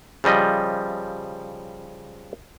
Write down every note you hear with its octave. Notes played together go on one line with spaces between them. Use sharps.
C#3 F3 G3 D#5